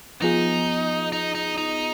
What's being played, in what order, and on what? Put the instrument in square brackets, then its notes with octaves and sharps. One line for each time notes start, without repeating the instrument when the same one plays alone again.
[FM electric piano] F3 B3 F4 G#4 [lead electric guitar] D#4
[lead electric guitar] D#4
D#4
D#4